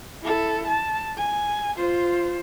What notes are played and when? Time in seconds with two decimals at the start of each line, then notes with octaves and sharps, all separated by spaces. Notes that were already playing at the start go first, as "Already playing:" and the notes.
0.24 E4 A4
0.67 A5
1.17 G#5
1.77 F4 C5